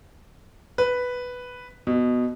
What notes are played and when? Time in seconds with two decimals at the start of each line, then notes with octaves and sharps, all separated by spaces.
0.78 B4
1.87 B2